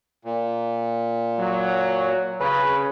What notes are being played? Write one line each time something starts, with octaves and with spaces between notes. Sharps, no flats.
A#2
F#3
C#3 B4